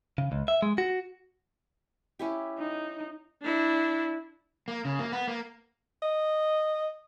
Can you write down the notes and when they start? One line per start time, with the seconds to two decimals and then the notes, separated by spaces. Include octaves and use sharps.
0.18 C#3
0.32 C#2
0.48 E5
0.62 G#3
0.78 F#4
2.19 C#4 E4 G4
2.58 D#4
3.43 D4 E4
4.68 A#3
4.85 C#3
4.99 A#3
5.12 B3
5.27 A#3
6.02 D#5